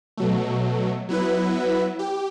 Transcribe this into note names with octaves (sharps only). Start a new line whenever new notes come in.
B2 F#3 A3
F#3 B3 E4 B4
G4